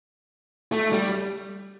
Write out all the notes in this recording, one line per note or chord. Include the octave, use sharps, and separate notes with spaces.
A3
G3